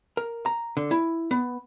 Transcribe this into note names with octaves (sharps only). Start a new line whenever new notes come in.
A#4
A#5
D3
E4
B3